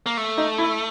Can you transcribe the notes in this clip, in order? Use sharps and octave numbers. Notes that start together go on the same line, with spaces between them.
A#3
A3
D#4
E4